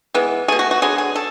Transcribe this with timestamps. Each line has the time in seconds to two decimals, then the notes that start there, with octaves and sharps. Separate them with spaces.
0.14 E3 G#3 B3
0.48 B2 A3 G#4
0.59 F#4
0.71 F#4
0.82 D3 F#3 B3 G#4
0.98 G#4
1.15 A4